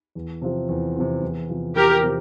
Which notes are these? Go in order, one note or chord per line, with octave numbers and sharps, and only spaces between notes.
E2
C3 F3 C4
E2
C3 F3 C4
E2
C3 F3
E2 G4 A#4
C3 F3